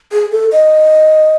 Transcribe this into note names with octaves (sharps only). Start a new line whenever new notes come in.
G#4
A4
D#5